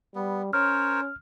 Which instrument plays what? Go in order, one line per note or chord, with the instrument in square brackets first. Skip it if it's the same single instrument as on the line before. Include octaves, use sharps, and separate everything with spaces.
[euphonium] G3 [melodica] B3
[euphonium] C#4 [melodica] A#4 C5 C#5 [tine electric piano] F6